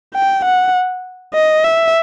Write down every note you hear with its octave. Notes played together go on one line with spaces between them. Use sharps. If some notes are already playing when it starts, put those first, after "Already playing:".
G5
F#5
D#5
E5